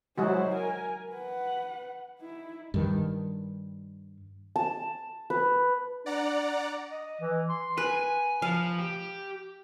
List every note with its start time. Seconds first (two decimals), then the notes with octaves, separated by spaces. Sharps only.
0.18 F#3 G#3 E4 F#4 C5
0.51 A#4 G#5
1.11 B4 F#5
2.19 D#4 E4
2.74 G2 D#3
4.56 A5
5.30 B4
6.06 D4 D5 F#5 A#5
6.91 D#5
7.20 E3
7.49 C6
7.78 B4 G#5
8.42 F3 F5
8.79 G4